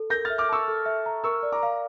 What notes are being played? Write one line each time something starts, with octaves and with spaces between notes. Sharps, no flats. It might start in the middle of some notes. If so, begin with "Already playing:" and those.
Already playing: A4
A#4 G6 A#6
F6 A6
E5
D6 F6
A5 C#6 E6
A4
E5
A#5
A#4 C#6 E6
D5
A#5 D6
F5